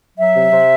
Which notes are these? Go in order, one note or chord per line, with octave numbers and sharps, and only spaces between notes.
F#3 E5
C3
C3